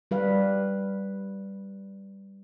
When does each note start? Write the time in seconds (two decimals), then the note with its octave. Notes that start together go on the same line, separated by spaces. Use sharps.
0.11 G3 B4 F5